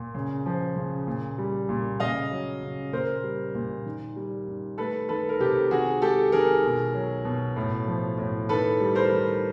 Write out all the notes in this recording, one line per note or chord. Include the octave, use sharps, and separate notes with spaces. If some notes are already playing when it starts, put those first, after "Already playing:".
Already playing: A#2
C#3
F3
C#3
A#2
G3
A#2
C#3 D#5 F5
F#3
C#3
A#2 A#4 C5
G3
A#2
D#3
G3
D#3
A3 A4 B4
D#3 A4 B4
A#4
C3 G4 A4
D#3 F#4 G#4
G#3 G4 A4
D#3 G#4 A#4
B2
F#3
B2
A2
F3
A2
D#3 A4 B4
G3
A#4 C5
D#3